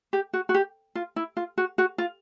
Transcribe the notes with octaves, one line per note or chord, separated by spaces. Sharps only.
G4
F#4
F#4
G4
F4
E4
F4
F#4
F#4
F4